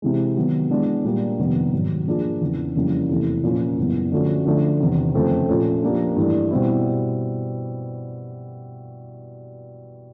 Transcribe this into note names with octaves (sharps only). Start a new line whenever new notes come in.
C3 E3 G#3
D#3 F#3 B3
E3 G#3 B3 D4
A#2 G3 A#3 D4
F2 C3 D#3 G3 B3
G#2 D#3 F#3
F3 A#3 D4 F4 G#4
E2 C#3 E3
F2 C#3 E3 G3 A#3
E2 C3 E3 A3
A#2 F3 A#3 C#4 F4
F#2 C#3 E3 G3 B3
D3 F3 A3 C#4 F#4
D3 F3 A3 D4
E2 C3 D#3
F2 C#3 F3 A3 C4
A#2 F3 A3 C#4
F3 A#3 D4 G4
G2 E3 A3
B2 G3 C4 E4